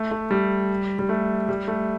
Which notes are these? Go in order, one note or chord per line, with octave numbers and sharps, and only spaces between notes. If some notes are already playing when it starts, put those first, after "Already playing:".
Already playing: A3
A3
G3
G3
A3
G3
A3